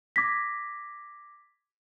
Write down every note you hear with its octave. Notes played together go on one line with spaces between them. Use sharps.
D6 G#6 A#6 B6